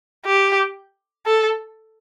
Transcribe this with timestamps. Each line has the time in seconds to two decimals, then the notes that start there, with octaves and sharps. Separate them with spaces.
0.26 G4
1.26 A4